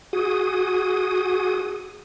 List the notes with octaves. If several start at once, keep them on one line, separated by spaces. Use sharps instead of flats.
F#4 G#4 D#6